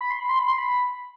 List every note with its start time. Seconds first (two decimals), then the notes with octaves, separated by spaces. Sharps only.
0.01 B5
0.10 C6
0.20 B5
0.29 C6
0.39 B5
0.48 C6
0.58 B5